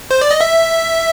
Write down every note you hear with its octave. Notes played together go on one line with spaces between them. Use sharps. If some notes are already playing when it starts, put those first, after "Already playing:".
C5
D5
D#5
E5